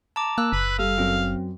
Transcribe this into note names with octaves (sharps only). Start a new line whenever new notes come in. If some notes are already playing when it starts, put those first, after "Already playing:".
A5 A#5 D6
A#3 E6 F#6
F#1 B4
G3 A4 F5
F#2 C4